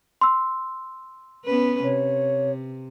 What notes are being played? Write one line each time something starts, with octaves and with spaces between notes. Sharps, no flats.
C6 E6
B3 C#4 B4
C3 C#5